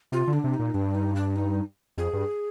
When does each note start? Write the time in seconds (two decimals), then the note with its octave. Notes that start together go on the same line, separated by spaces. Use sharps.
0.12 C3 F4
0.27 D3
0.33 D4
0.44 C3
0.54 D#4
0.59 A#2
0.74 G2 D4
0.95 D#4
1.16 D4
1.36 D#4
1.97 F2 G#4
2.13 G2